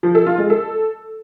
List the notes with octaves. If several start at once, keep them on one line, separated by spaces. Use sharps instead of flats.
F3
A4
F4
G#3
A4